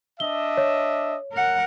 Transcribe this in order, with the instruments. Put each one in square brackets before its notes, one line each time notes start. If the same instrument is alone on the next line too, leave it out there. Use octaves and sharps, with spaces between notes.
[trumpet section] D4 D#5 E5 [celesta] G7
[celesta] C#5
[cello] A#4 F#5